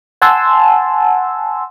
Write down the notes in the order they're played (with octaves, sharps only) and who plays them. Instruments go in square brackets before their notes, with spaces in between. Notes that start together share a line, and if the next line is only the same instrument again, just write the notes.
[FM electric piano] F#5 G#5 A5 C6 E6